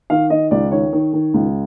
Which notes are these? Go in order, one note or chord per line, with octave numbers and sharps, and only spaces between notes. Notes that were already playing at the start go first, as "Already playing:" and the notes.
D#3 F5
D#3 D#5
C#2 D5
D#3 C#5
D#3
D#3
C#2